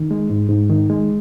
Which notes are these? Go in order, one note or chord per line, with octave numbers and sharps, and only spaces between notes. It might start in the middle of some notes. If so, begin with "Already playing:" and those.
Already playing: D#3
G#3
G#2
G#2
D#3
G#3